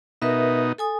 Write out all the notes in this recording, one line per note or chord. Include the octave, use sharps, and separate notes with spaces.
B2 D#4 A#4 B4 E5
A4 G#5 D#6